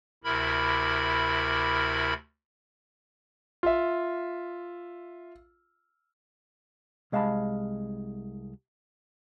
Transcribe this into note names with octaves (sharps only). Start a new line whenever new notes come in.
D2 C3 E4 A#4 B5
F4 E5
C2 G#3 F5 F#5 A5 B5